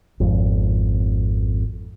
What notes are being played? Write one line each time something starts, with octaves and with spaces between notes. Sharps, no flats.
G#1 F2